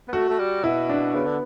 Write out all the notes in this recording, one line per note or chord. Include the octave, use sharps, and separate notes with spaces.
B3
A3 F#4
A3
G3
B2 E4
D4
C#3 B3
D3